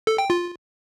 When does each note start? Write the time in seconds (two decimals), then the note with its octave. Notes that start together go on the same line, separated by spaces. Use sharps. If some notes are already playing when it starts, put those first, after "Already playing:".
0.07 A4
0.18 G5
0.30 F4